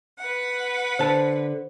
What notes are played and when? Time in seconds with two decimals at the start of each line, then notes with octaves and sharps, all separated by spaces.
0.19 B4 F#5
0.99 D3 C5 A5